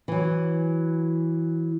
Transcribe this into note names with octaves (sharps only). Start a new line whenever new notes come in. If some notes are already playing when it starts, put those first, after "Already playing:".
E3 F#3